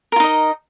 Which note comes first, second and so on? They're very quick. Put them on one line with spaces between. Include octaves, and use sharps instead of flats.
A#4 F4 D#4 D#5